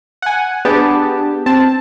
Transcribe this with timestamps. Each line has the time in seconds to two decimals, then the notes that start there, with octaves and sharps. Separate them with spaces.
0.22 F#5 G#5
0.65 B3 D4 G4 G#4 A5
1.46 C4 A5